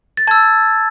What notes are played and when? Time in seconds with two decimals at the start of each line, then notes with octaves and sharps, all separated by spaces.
0.17 A6
0.27 A5 E6 G#6